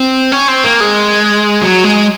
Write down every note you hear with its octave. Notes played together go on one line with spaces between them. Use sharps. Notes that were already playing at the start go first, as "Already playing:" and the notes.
Already playing: C4
C#4
C4
A#3
G#3
F#3
G#3